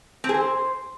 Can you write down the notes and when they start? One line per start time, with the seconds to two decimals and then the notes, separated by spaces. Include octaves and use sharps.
0.24 C4
0.29 G#4
0.34 C5